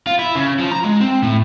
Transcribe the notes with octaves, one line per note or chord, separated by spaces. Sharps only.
F4
E4
C#3
F3
A#5
G#3
C4
A2